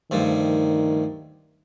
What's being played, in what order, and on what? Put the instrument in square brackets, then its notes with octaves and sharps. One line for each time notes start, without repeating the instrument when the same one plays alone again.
[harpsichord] D2 G2 F3 [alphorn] D#3